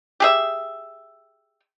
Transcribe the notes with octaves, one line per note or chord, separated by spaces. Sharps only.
G4 G#4 E5